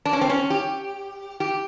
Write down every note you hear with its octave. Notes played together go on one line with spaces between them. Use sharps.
D4
C#4
C4
C#4
G4
G4